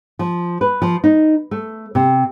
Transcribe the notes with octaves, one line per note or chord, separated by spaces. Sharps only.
F3
B4
F3
D#4
A3
C3